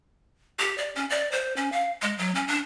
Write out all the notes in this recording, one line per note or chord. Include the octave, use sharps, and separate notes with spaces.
G4
D5
C#4
D5
C5
C#4
F5
G#3
F#3
C#4
D4